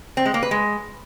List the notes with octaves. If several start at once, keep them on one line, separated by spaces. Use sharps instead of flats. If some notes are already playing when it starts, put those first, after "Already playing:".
C4
G#3
A#3
B4
G#3